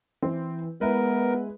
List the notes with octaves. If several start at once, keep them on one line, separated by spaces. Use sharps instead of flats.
E3 C4
G#3 B3 E4 A#4 B4